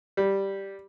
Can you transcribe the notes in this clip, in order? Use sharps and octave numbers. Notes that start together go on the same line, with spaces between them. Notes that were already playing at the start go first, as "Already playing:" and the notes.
G3